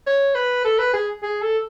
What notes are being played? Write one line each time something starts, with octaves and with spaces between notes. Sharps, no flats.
C#5
B4
A4
B4
G#4
G#4
A4